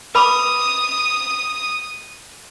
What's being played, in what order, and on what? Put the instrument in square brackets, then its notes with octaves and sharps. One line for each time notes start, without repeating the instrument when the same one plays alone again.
[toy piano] B4 B5 D6 [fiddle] D#6